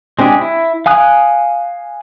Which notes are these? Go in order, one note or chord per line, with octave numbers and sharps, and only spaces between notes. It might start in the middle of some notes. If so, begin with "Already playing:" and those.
G#3 C4 D4 G4 G#4
E4
F5 G#5 D#6 F#6